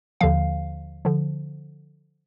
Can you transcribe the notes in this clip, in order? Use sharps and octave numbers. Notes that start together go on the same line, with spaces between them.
D#2 D3 F3 F5
D3 F3